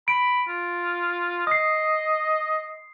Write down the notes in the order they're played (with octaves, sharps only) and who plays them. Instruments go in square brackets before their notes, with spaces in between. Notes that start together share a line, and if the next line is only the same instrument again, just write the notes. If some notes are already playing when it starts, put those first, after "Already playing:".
[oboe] B5 [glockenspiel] D7
[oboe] F4
[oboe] D#5 [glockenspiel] D#6 C7